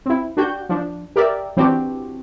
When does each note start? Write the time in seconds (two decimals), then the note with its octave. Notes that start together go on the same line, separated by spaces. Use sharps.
0.06 C4 E4
0.37 D4 F#4 G4 G6
0.69 F3 D4
1.16 G4 A#4 D5 E5
1.57 E3 C4 D4 F#4 G4